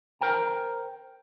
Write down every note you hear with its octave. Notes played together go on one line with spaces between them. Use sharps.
A#4 C5 G5 A#5